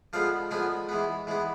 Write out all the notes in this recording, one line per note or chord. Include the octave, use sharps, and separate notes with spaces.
D3 F3 G#3 B3 F5
D3 F3 G#3 B3 G#5
E3 G#3 B3
E3 G#3 B3